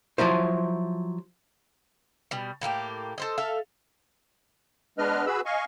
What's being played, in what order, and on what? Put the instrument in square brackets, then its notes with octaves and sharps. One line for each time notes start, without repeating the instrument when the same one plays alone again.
[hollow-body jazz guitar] F3 F#3 E4 C5
[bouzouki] B2 G3
A2 A#3 F4 G4
A4 C5 D#5
A4 E5 F5
[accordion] G#3 B3 D4 B4 D#5 F6
F#4 G#4 B4 B5 E6
D#5 F5 G#5 C#6